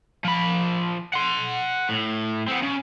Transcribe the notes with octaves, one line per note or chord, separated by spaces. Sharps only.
F3 B5
F#5 C6
A2
B3 C4
C#3